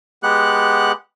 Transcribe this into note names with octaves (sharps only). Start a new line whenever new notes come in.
G#3 B3 G4 F#5 F#6